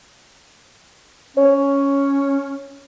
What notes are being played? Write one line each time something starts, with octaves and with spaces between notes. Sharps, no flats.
C#4 C#5